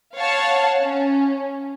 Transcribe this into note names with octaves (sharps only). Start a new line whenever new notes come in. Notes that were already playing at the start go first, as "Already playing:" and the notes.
C#5 F5 F#5 A5
C#4